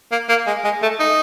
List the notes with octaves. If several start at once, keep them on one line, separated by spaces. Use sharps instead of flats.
A#3
A#3
G#3
G#3
A3
D#4